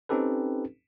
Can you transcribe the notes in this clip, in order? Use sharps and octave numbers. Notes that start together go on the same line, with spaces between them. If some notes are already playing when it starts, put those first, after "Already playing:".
C4 C#4 D#4 G4 A4 B4